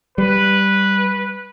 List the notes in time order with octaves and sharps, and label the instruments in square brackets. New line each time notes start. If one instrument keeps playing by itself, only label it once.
[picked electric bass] G3 [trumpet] B4